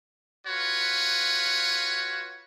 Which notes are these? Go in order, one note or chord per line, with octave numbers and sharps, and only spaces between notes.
F4 F#4 B4 C#5